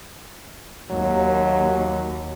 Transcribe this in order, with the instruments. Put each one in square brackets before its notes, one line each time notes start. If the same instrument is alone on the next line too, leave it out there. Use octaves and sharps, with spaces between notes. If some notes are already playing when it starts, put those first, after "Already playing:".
[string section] D#2 [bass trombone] F#3